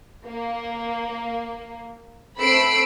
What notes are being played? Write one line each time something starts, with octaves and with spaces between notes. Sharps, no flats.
A#3
A3 C4 B5 E6 C7 D7